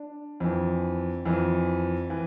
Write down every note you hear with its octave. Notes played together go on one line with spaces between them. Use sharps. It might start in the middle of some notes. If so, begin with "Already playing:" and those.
Already playing: D4
F2 E3
F2 E3
E3